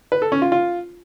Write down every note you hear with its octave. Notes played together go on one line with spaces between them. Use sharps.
B4
A4
C#4
F4
F4